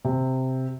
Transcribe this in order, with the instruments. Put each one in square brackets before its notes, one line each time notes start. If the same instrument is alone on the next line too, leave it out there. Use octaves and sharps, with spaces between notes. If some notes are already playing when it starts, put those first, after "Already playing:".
[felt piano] C3